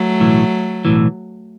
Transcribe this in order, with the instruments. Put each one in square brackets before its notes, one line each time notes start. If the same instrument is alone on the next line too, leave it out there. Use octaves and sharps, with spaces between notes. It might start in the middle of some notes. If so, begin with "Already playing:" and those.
Already playing: [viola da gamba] F#3 A3
[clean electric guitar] B1 A2 E3
B1 A2 E3